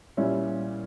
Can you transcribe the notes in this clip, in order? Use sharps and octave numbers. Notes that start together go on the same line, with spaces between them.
A#2 G3 C#4 E4